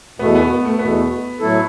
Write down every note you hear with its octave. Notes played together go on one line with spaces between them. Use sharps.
E2 B2 A3 B3
B3
B3
A3
E2 B2 A3 B3
A2 F#3 A3 E4 A4